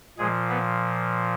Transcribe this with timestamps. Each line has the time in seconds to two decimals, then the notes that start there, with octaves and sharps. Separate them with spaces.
0.18 A#2 F3 G#3 G#4
0.49 B3 B4